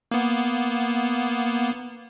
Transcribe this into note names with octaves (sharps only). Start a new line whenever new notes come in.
A#3 B3